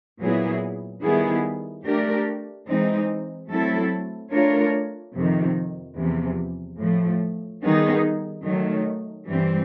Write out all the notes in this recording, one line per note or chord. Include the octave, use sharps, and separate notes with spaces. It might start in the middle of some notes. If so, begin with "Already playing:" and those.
A#2 F#3 B3 E4 G#4
D#3 G3 B3 E4 G#4
A3 D4 G4 A#4 D5
E3 G#3 C4 D#4
F#3 A3 C4 E4 A4
A3 D4 F4 A#4 C#5
F2 C3 D#3
E2 C3 F3
A2 F3 A3
D#3 G3 B3 D#4 G#4
D#3 F#3 A3
G2 E3 G3 C4